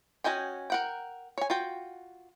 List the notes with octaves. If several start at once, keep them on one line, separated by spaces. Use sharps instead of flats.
C#4 F#4 D#5 G5 G#5
A#4 F#5 G5
C#5 G#5
F4 F#4 G5